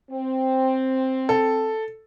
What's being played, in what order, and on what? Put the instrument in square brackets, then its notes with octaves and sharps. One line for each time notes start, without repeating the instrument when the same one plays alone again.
[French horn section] C4
[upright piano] A4